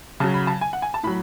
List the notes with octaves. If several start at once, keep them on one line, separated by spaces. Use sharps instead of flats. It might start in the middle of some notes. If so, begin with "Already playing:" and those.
C#3 F#3 A5
B5
A5
G#5
F#5
G#5
A5
A2 F#3 B5